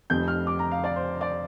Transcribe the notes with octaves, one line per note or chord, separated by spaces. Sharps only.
F1 F2 C3 G6
F6
D6
A#5
F5
D5
C5
D5